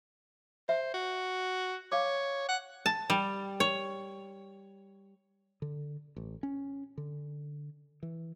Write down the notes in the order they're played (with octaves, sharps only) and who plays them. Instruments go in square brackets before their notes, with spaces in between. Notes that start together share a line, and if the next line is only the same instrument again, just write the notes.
[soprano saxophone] C5 [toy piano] E5
[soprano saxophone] F#4
[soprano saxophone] C#5 [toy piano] F5 D6
[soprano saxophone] F#5
[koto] A5
G3
C#5
[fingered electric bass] D3
A1
C#4
D3
E3